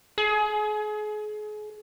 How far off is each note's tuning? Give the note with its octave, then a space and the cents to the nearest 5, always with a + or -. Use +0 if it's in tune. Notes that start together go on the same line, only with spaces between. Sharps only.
G#4 +35